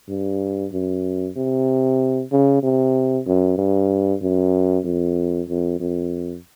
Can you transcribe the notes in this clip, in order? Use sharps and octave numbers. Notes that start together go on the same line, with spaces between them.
G2
F#2
C3
C#3
C3
F#2
G2
F#2
F2
F2
F2